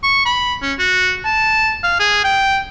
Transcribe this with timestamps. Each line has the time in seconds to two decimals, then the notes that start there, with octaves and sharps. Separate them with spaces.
0.03 C#6
0.26 B5
0.62 C#4
0.79 F#4
1.25 A5
1.83 F5
2.00 G#4
2.24 G5